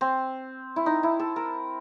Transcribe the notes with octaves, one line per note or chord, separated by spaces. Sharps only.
C4
E4
D#4
E4
A4
A#4